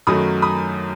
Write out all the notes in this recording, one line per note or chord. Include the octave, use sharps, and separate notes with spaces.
F#2 D#3 F#3 A3 B5 D#6
B5 D#6